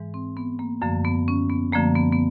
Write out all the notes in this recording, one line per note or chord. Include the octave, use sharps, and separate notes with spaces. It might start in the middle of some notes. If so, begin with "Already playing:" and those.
Already playing: G#2 E3 G#3
C4
B3
A#3
F#2 D3 F3 A3 A#3
B3
C#4
B3
F#2 D3 F3 A3 A#3
B3
B3